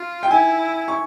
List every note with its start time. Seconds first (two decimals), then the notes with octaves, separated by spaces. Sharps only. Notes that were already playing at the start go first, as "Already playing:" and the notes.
Already playing: F4
0.23 G5
0.30 E4 G#5
0.88 C#6